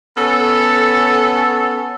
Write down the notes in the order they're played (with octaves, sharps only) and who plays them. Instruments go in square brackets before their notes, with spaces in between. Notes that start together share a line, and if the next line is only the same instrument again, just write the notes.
[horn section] B3 C#4 A4